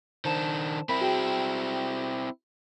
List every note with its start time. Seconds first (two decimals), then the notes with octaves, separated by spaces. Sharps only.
0.25 D#3 D4 C5 A5 E7
0.89 C4 E4 A#4 B5 B6
1.01 F#4 G#4 G5